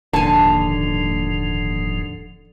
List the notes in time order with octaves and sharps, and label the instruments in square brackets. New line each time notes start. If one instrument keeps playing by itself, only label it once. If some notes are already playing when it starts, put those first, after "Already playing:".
[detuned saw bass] D#1 [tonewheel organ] G#2 F3 [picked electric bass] D3 [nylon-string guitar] G#5 A5